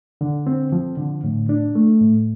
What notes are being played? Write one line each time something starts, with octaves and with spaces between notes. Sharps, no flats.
D3
C4
F3
D3
A2
D4
A3
A2